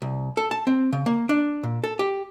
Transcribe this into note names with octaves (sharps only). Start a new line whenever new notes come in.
C2
A4
A5
C4
C#3
A#3
D4
A#2
A4
G4